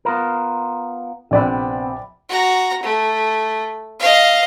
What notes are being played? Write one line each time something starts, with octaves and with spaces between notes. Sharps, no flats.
B3 F4 A#4
A#1 C3 B3 C4 D5 B5
F#4 A#5
A3
D#5 F5